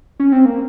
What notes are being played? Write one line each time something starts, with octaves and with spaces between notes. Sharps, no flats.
C#4
C4
A#3